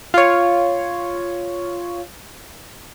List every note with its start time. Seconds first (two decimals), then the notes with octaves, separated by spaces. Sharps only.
0.14 F4 C#5